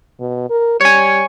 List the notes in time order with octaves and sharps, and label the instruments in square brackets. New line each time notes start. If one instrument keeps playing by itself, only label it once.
[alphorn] B2
A#4
[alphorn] G3 [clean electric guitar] C#5 G#5